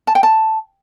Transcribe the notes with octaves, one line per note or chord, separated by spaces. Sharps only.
A5
G5
A5